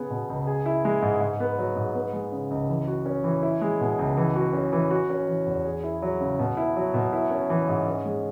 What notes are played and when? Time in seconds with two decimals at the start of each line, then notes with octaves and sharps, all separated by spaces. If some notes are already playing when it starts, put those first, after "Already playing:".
Already playing: C#3 B3 G#4
0.10 B2
0.29 C#2
0.47 G#4
0.66 E4
0.85 G#3
1.02 G#2
1.21 G#2
1.40 B3
1.58 F#3
1.76 G#2
1.95 B3
2.13 G#3
2.32 C#3
2.51 C#2
2.69 E3
2.87 F#4
3.06 C#4
3.24 E3
3.43 E4
3.61 G#3
3.81 B2
3.99 C#2
4.17 E3
4.35 F#4
4.53 C#4
4.73 E3
4.91 F#4
5.10 C#4
5.27 E3
5.46 E2
5.65 G#4
5.83 E4
6.02 F#3
6.20 C#3
6.39 B2
6.57 E4
6.76 F#3
6.94 B2
7.13 E4
7.31 C#4
7.50 E3
7.69 G#2
7.86 C#4
8.05 G#3